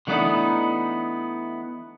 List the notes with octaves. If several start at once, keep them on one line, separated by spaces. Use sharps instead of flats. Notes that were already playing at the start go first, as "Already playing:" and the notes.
D3 E3 A3 B3 D4 D#4